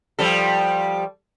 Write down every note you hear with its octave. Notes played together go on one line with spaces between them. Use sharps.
F3 G3 A4